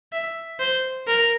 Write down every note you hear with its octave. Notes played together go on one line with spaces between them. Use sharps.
E5
C5
A#4